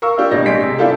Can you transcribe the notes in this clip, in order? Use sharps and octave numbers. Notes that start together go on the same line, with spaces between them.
A#4 F5 C#6 E6
A#3 D4 F4 G4 A#4
A1 B2 D4 G4 D#5 A#6
G#3 B6 D7
C3
B3 D4 E4 F4 G4 A4